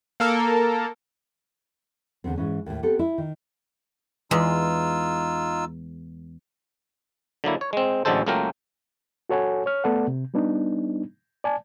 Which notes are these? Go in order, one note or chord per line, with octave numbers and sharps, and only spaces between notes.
A#3 A4 A#4
E2 D3 B3 C4
G#2 E3 C#4
D#2 A2
B3 C4 G4 A4
E4
D#3
E2 G#3 D#4 F4 E6
D3 F#3 A#3 E4
C#5
G#3 C4
A1 D3 F#3 G#3 A4 C5
C#2 F#3 A3 A#3 A#4 G5
F#4 A4 C#5 F#5 G#5
C#5 F6
A3 B3 A4 D5 F#5
C3
G3 B3 D4 D#4
D5 G#5 A5